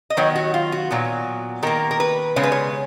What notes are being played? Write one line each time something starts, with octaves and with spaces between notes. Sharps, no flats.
D#5
D#3 F#3 B3 C#5
F#4
F4
F#4
A#2 F#3 B3
D#3 A#3 A#4
A#4
B4
C#3 G#3 B3 C#5
B4
C#5